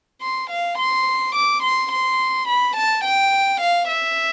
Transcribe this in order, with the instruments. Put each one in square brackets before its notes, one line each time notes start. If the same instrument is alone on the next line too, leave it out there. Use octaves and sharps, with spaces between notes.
[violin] C6
F5
C6
D6
C6
C6
B5
A5
G5
F5
E5